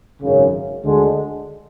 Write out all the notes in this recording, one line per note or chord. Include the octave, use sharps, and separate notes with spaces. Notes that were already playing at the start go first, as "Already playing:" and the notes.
G#1 F#2 C#3
D2 D3 G#3